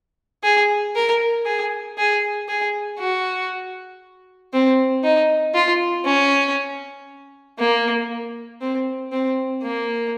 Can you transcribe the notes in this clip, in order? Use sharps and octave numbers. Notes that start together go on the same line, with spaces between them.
G#4
A#4
G#4
G#4
G#4
F#4
C4
D#4
F4
C#4
A#3
C4
C4
A#3